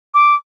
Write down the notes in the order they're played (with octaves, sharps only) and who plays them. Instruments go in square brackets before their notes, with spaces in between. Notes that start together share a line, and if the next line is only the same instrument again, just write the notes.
[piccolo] D6